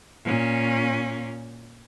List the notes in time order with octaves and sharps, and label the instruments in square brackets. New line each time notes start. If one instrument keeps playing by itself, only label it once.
[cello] A#2 C#4